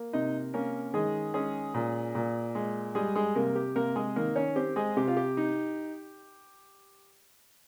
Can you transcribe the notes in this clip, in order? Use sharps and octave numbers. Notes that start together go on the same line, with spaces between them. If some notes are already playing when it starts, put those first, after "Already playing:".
Already playing: A#3
C3 D#4 D#5
A#3 C#4 A#4
D#3 G#3 G#4
G#3 C#4 G#4
A#2
A#2
G#3
G3 G#3 G#4
G#3 G#4
C3 A#3 A#4
G4
C3 A#3 A#4
G#3 G#4
D#3 A#3 A#4
C#4 C#5
C4 G4
G#3 G#4
C3 G4
F4
G4
D#4